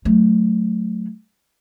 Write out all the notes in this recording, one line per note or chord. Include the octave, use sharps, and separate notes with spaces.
F#3 A3